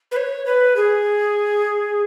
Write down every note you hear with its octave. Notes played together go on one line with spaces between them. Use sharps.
B4
C#5
B4
G#4